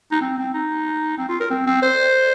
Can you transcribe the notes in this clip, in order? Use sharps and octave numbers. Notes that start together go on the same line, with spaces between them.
D#4
C4
C4
D#4
C4
F4
A#4
C4
C4
C5